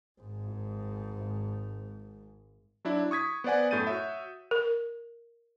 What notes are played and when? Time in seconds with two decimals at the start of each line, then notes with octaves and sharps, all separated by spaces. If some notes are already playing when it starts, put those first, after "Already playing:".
0.21 G#1 G#2
2.85 F#3 D4 E4
3.11 C#6 D#6 G#6 B6
3.44 B3 C5 D5 F#5 G#5
3.71 F#2 A2 A3 G6 A6 D#7
3.87 F#4 C#5 E5
4.51 A#4